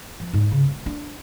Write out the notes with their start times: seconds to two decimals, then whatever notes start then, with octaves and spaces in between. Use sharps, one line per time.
0.20 F3
0.33 G#2
0.51 C#3
0.65 E1
0.86 D4